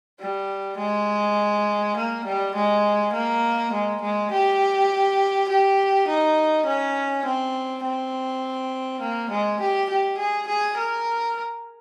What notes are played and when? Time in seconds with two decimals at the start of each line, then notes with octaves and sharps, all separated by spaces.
0.20 G3
0.78 G#3
1.97 A#3
2.25 G3
2.55 G#3
3.13 A#3
3.72 G#3
4.01 G#3
4.32 G4
5.48 G4
6.08 D#4
6.66 C#4
7.25 C4
7.84 C4
9.01 A#3
9.31 G#3
9.60 G4
9.89 G4
10.18 G#4
10.47 G#4
10.78 A#4